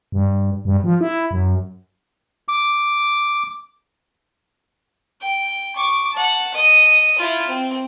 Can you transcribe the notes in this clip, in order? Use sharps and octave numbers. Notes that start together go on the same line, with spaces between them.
G2
G2
F3
E4
F#2
D6
G5
C#6 D6
F#5 A5
D#5
E4 F4
C4